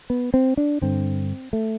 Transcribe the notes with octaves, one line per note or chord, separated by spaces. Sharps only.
B3
C4
D4
G2 D3 C4
A3